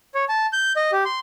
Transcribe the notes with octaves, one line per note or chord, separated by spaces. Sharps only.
C#5
A5
G6
D#5
G4
C6